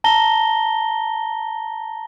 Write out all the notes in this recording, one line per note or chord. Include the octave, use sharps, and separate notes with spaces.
A5 A#5 A#6 G7